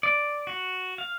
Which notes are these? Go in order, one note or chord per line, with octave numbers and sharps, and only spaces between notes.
D5
F#4
F5